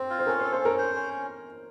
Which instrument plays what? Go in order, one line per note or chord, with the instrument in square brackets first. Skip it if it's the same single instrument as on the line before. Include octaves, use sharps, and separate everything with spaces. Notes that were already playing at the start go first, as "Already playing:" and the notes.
Already playing: [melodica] C4 [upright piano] C5
[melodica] F4
[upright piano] C5
[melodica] C#4 [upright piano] A#4
[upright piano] C5
[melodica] A4
[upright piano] C5
[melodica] C#4 [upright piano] A#4
[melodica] C5
C#4